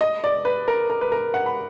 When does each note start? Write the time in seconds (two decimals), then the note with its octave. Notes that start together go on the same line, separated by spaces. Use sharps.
0.01 D#5
0.24 D5
0.45 B4
0.68 A#4
0.90 A#4
1.01 B4
1.12 A#4
1.34 F#5
1.46 B5